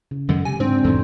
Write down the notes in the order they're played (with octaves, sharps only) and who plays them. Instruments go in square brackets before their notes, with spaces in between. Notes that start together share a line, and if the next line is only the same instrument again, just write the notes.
[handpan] C#3
[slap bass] F#2 D#3 G#3 [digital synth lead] D3
[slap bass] C3 [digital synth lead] G#5
[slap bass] G#2 [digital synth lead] C4 [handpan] D4 C5
[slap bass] E2 G#2 B2 [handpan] A4